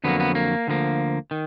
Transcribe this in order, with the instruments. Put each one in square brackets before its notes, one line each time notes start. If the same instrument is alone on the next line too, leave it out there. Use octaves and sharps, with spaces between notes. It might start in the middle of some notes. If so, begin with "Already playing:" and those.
[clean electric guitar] F2 D3 F#3 A#3 B3
B3
A#3
D2 D3 F3 A#3
D#3